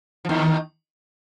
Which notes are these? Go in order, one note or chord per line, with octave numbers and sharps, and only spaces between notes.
F3
D#2 D#3